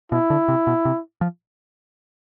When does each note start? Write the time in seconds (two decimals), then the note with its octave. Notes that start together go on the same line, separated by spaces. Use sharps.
0.12 B2 E4
0.30 D3
0.48 C3
0.67 B2
0.85 C3
1.21 F3